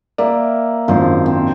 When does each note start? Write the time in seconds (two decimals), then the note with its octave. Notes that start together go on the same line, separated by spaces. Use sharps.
0.18 A#3 A#4 D5 E5
0.88 G#1 F#2 F3 D4 C5
1.26 C4